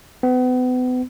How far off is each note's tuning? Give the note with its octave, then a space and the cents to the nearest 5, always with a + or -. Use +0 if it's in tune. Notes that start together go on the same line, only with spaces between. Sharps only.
B3 +35